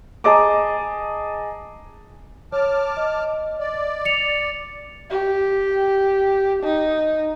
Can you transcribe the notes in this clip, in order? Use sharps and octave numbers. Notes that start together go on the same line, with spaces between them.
G#4 D#5 A5 A#5 D6
C#5 A5 D6 F6
D#5
D5
C#7 F7
G4
D#4